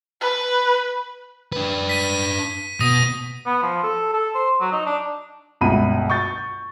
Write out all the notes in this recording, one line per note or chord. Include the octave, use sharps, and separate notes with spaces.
B4
D4 B4
B6 D#7
B2 D#6 A#6 D#7
B3
F3
A4
A4
C5
F#3
D#4
D4
G1 C#2 B2 B5 D#7
C#6 G6 A6